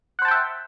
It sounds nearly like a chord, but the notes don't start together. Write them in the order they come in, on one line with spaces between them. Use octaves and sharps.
F#5 C5 A5 G5 E5